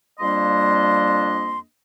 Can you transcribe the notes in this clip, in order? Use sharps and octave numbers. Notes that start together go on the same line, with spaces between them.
F2 G3 A#3 D4 D#5 C6